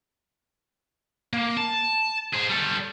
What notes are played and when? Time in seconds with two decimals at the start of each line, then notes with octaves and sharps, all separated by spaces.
1.33 A#3
1.57 A5
2.33 G#4 C5
2.49 G3 A4